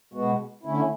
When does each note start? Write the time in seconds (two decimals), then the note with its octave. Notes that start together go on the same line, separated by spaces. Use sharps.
0.14 B2 G#3 B3 F#4
0.63 D3 A3 C#4 E4